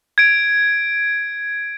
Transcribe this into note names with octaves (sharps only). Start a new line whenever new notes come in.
G#6 D7